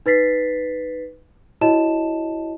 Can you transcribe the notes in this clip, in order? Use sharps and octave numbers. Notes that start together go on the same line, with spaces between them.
D#4 B4 A6 B6 C7
E4 F#4 C#5 D#5 A5 E7